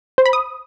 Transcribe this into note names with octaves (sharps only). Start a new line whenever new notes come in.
C5
B5
D#6